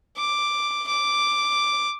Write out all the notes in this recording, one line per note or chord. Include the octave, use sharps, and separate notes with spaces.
D6
D6